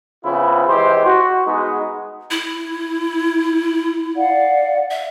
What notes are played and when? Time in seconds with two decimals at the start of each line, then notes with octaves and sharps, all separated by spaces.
0.23 C#3 F3 B3 C4 E4 F4
0.67 E2 E3 G#3 G4 C5
1.04 F#4
1.46 G#3 B3 D#4
2.31 E4
4.16 D5 F5 F#5
4.91 E5